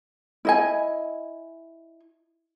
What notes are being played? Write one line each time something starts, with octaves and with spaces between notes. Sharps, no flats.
E4 D#5 G#5